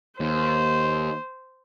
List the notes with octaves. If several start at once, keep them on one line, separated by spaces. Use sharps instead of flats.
D#2 C5